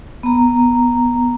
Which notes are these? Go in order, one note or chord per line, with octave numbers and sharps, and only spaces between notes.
B3 A#5